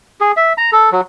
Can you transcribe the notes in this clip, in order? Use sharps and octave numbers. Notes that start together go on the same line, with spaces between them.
G#4
E5
A#5
A4
F#3